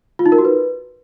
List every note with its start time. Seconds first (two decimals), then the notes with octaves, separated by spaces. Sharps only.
0.19 F4
0.26 D#4
0.32 A#4
0.38 F#4
0.45 B4